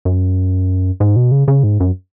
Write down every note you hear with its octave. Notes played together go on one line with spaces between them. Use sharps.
F#2
G#2
B2
C#3
C#3
G#2
F#2